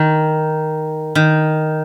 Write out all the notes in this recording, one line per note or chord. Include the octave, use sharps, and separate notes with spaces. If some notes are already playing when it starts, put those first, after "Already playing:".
Already playing: D#3
D#3